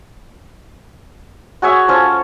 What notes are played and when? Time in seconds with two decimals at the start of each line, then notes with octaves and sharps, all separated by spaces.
1.62 F#4 G#4 C#5 E5
1.88 F3 C#4 A4